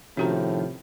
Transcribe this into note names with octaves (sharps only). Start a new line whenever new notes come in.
A2 C3 D#3 F3 C#4 F#4 A#5